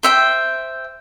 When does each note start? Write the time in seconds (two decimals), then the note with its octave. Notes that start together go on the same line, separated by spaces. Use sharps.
0.03 C5 E5 G5